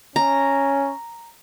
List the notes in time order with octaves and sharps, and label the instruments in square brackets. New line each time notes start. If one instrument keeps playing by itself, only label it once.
[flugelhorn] C#4 [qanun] A#5